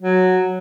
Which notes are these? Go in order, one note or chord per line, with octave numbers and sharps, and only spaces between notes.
F#3